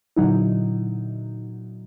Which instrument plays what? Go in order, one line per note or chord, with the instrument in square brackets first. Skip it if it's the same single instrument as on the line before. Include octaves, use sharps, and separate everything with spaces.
[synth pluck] A#2 D3 F#3 D#4 E4